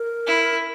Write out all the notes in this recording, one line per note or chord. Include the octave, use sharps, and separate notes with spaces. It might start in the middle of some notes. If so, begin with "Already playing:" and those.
Already playing: A#4
E4